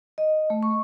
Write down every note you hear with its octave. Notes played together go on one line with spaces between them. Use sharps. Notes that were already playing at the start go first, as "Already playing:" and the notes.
D#5
A3
C#6